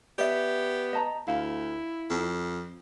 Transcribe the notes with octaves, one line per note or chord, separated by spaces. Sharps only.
B3 G4 D5 E5
D#5 A5 A#5
D2 E4 F5
F2